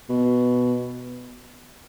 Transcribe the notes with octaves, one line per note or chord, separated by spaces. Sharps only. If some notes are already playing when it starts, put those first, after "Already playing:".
B2